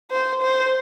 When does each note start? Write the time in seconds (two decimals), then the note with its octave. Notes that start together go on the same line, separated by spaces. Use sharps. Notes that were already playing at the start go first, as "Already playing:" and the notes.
0.11 C5
0.42 C5